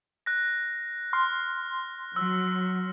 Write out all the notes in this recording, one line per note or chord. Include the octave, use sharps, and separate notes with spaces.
F#6 A#6
C6 F6
F#3 E6